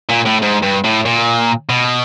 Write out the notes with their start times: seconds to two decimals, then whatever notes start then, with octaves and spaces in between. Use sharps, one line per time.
0.09 A#2
0.26 A2
0.42 G#2
0.63 G2
0.85 A2
1.06 A#2
1.69 B2